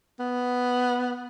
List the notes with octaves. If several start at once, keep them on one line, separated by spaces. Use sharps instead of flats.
B3